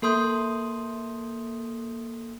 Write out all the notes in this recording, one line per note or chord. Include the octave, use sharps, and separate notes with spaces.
A#3 A4 C6 D#6 G6